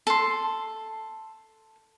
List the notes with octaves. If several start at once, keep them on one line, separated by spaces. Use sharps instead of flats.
A4 C6